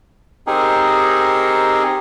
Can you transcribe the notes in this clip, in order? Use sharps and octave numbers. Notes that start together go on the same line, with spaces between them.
C4 D#4 G4 G#4 A#4